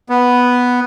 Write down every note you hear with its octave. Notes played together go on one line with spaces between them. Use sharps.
B3